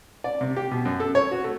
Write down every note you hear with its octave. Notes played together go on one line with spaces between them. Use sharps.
D5
C3
G4
B2
F#2
A4
C#5
F#4
A3